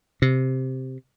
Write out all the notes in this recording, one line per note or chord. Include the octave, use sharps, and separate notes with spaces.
C3